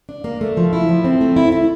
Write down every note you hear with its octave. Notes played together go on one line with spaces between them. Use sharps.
D4
A#3
A3
F3
E4
F3
C4
A3
E4
E4